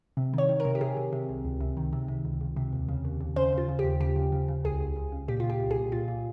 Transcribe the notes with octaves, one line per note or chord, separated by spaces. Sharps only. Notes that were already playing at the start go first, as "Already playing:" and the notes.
C3
D#3 C#5
D#3
A#4
C3
G4
C3 G#4
C3
C3
C2
C#2
C3
D#3
C3
C3
C#2
C#2
C3
D#2
C#3
D#2
D#2
C#3 C5
C#3
F4
C#3
G4
D#2
C#3 G4
C#3
C#3
C#3
C#2 G#4
C#2
C#2
C#3
A#2 G4
A#2 F4
G4
C2
G#4
A#2
A#2 F4
A#2